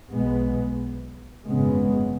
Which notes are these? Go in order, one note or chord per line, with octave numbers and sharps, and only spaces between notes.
B1 B2 G#3 B3
G#1 F#2 C#3 G#3 B3